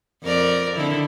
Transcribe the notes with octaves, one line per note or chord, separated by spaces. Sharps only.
F2 A#4 D5
D3 D#3 E4